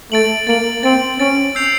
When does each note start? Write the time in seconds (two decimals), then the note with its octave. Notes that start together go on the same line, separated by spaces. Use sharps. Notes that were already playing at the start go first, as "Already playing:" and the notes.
0.12 A3 A6 D7 F#7
0.47 A#3 A6 D7 F#7
0.83 C4 A6 D7 F#7
1.19 C#4 A6 D7 F#7
1.55 E6 G6 C7 F7